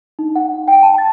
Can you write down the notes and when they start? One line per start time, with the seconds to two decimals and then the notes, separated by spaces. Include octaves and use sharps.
0.19 D#4
0.36 F#5
0.68 G5
0.83 A5
0.98 A6